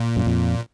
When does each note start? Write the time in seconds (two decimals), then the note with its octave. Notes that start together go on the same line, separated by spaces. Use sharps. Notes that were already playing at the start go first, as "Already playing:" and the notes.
Already playing: A#2
0.16 F#2
0.26 F2